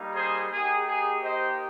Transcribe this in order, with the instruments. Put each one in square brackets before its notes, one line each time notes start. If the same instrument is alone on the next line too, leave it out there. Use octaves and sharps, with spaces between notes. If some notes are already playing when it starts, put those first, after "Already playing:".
Already playing: [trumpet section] G3 A#3 D#4
G#4 C5
A#3 D#4 G4 G#4
G#4
C5 D#5